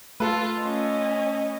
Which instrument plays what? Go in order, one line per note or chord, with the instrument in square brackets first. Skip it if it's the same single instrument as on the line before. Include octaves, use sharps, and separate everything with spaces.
[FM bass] A3 [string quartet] F4 [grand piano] A4 B4
[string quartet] C#4 [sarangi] D#5